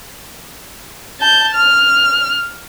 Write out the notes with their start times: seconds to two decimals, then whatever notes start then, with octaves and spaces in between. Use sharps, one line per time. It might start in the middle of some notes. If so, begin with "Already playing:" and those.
1.20 A5 G6
1.55 F6